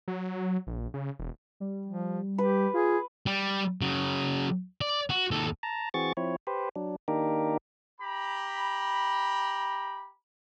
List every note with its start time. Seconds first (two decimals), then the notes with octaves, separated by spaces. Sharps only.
0.08 F#3
0.67 A#1
0.94 C#3
1.19 E1
1.60 G3
1.86 F3
2.38 G4 B4
2.74 F4 G#4
3.26 G3
3.81 C#3 F#3
4.81 D5
5.10 F#4
5.31 D#2 A4
5.63 A5 A#5
5.94 E3 C4 F#4 G#4 C#6 A6
6.17 F3 C4 E4 C#5
6.47 G4 B4 C5
6.76 F#3 D4
7.08 D#3 A#3 D4 D#4 G4 A#4
8.00 G4 A#5 B5